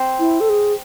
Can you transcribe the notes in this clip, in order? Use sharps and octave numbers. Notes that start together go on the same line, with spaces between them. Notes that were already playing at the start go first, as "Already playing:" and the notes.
Already playing: C4
E4
A4
G#4